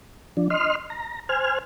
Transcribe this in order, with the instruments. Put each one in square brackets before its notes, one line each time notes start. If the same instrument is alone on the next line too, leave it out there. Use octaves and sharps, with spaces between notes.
[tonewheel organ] F3 D4
D#5 C6 F6
A#5
C5 G#5 F6